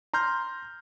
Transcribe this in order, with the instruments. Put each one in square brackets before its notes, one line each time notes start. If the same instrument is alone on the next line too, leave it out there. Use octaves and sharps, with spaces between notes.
[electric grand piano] A#5 C6 F6 G6